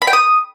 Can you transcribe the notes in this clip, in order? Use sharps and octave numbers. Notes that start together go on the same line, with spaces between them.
B5
G5
D#6